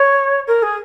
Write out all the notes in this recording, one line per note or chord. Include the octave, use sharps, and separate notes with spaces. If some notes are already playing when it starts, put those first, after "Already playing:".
Already playing: C#5
A#4
G#4